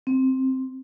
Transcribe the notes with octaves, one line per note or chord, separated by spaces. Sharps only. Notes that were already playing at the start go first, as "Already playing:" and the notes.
C4